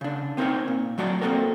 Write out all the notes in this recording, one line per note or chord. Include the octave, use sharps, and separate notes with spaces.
C#3 D4
B3 C4 D#4 A#4 C5 C#5
A#2
F#3 A3 F#4 D5 F#5 A#5
A#3 C4 D#4 F#4 A4 A#4